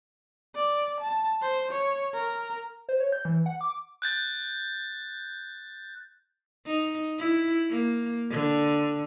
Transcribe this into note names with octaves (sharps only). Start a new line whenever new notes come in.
D5
A5
C5
C#5
A#4
C5
C#5
G6
E3
F#5
D6
F#6 G6 A6
D#4
E4
A#3
D3